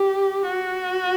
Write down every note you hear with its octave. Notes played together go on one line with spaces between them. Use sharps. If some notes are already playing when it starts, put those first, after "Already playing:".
Already playing: G4
F#4